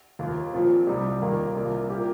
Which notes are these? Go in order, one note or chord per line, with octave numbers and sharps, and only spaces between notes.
D#2 D#3 A#3 F4
A#2 F3 C4
C2 C3 G3 D#4
D#2 D#3 A#3 F4
C2 C3 G3 A#3 F4
A#2 A#3 G4